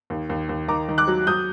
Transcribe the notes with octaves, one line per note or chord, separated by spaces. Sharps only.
D#2
D#2
D#2
D#3 A#5 D6
D#3
D6 F#6
F#3
F#3 D#6 G6